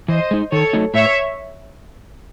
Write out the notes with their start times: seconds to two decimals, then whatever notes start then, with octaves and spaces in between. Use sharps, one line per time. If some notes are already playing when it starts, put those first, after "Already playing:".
0.08 E3 C5 D#5
0.31 G#3 D#4
0.51 D#3 A4 C#5
0.73 F#3 A3 D#4
0.94 A2 C#5 E5